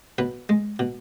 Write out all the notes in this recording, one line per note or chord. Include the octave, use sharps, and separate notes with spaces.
B2 B4
G#3
B2